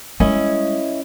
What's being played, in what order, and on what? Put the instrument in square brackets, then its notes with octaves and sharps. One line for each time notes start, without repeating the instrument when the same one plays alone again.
[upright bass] G3 G#3 [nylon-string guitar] C#4 [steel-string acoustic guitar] E4 D#5